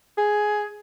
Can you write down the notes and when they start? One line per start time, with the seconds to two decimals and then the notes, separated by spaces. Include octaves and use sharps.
0.18 G#4